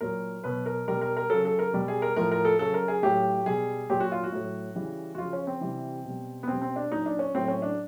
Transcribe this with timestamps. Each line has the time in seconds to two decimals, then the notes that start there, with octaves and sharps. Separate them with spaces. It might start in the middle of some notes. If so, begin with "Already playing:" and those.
0.01 A#2 F#3 A#4
0.44 B2 F#3 B4
0.66 A#4
0.88 B2 G3 A#4
1.01 A#4
1.17 A#4
1.30 C#3 F#3 A4
1.45 A4
1.59 A#4
1.73 B2 G3
1.88 G#4
2.02 A#4
2.16 A2 F3 A#4
2.32 A#4
2.45 A4
2.59 C#3 F#3 A4
2.74 A#4
2.88 G#4
3.03 A2 F#3 G4
3.46 B2 G3 G#4
3.89 A#2 F#3 G4
4.00 F#4
4.12 F4
4.24 F#4
4.32 A2 F#3
4.75 C#3 E3 G3
5.15 F#4
5.18 C#3 F3 F4
5.33 C#4
5.47 C4
5.61 C3 E3 G3
6.05 B2 G3
6.43 B3
6.48 B2 G3 C4
6.62 C4
6.76 D4
6.91 A#2 F#3 D#4
7.06 D4
7.19 C#4
7.35 A2 F#3 C4
7.48 C#4
7.62 D4